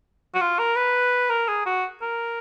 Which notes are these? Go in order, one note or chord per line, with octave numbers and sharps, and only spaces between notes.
F#4
F4
A#4
B4
A#4
G#4
F#4
A#4